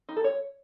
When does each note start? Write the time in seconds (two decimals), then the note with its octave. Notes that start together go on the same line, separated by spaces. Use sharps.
0.09 D#4
0.16 A4
0.24 C#5